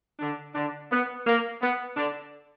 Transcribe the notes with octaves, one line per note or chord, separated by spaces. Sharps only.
D3 D4
D3 D4
B3
A#3
B3
D3 D4